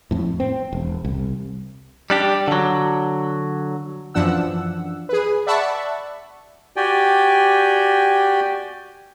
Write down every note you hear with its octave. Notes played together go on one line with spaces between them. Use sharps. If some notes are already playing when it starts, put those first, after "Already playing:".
F2 A2
C4
E1
C2
G3 D4 G4
D3 F#3
F#2 E3 F3 D4 F#5 E6
G#4 B4
D5 E5 F#5 A5 B5 C#6
F#4 G4 D5 G5 G#5